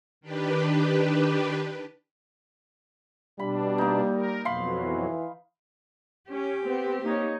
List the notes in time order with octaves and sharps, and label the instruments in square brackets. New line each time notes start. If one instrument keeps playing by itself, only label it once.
[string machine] D#3 D4 G4 B4
[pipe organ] B2 D4 [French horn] G3 [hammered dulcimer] B5
[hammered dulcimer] A#3 D#4
[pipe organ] A#4
[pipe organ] F2 B2 F#3 [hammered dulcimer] F5 B5 C6
[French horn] E3
[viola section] C#4 [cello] G4
[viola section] B3 C4
A#3 D#4 C#5